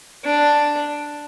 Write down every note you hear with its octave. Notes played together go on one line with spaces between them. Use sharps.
D4